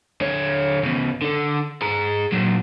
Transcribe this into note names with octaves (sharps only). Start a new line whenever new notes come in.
D3 C#5
C#3 B3
D3 A4
G#4 A#5
A#2 F#3